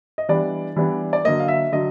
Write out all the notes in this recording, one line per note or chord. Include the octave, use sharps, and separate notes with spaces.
D#5
E3 G3 B3 D4 D5
E3 G3 B3 D4
D5
D3 F#3 A#3 D#5
F5
E5
D3 F#3 D#5